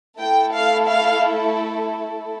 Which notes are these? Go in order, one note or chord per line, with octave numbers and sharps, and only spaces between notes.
A3 E4 A4 G5
F5
F5